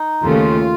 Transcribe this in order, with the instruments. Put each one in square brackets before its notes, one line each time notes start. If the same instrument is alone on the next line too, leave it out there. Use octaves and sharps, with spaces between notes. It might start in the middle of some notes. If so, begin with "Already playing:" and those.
Already playing: [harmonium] D#4
[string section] D#2 C#3 A3 [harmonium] F4